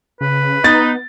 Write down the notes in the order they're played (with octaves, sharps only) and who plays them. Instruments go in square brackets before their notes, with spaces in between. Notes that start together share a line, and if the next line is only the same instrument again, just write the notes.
[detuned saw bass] C#3 [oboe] B4
[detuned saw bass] B3 [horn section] D#4 [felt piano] A6